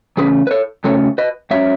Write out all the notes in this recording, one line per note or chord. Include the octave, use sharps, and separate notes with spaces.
C#3 E3 A3 C#4 G#4 B4
B4
A4 C#5
F#2 C#3 F#3 A3 C#4 A4 C#5
B4 D#5
G#2 F#3 C#4 C#5 E5